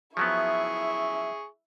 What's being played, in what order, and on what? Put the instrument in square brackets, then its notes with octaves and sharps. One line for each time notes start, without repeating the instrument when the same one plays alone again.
[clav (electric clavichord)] F3 F#3 B3 [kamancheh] E4 E5 [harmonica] G#4 C#6